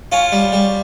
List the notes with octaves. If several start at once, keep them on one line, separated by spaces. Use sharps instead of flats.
C#4 F4
G3
G3